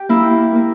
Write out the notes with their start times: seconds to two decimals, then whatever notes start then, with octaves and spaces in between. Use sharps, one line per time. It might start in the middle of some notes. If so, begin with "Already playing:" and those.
Already playing: G4
0.09 A#3 E4
0.55 A#3